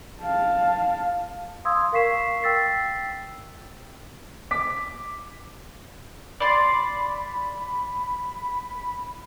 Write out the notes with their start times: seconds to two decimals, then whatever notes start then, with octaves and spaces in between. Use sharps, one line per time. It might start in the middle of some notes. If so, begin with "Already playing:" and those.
0.22 F5 A5
1.65 F5 C6 D#6 E6 G#6
1.92 A#4 F5 C#6 B6 C7 E7
2.42 G5 E6 A6 B6 C7
4.51 D6 B6
6.40 D5 B5 C6